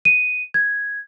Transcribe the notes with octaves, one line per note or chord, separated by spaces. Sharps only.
D#7
G#6